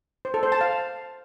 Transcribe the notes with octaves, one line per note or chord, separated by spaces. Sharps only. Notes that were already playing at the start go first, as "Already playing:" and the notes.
C5
A4
C5
A5
F5